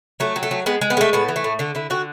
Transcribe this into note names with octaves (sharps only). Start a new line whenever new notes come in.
F#3 A3
F#3
A3
F#3
G#3 B3
G#3
B3
G#3 A3
A2 B3
E3
A3
A2
D3 A3
D3 E4
D3 F#4